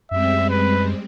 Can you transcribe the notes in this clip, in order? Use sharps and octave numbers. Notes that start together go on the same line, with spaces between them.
F#2 G3 G#3 C4 E5
B4